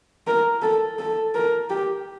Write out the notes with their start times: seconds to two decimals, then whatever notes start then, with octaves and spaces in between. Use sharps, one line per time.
0.27 A#4
0.62 A4
0.99 A4
1.34 A#4
1.70 G4